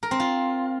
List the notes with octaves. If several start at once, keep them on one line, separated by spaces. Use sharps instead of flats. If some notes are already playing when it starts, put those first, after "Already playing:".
A#4
C4
F4